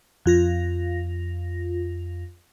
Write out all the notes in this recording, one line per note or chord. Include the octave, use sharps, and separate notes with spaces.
F2 F4 A#6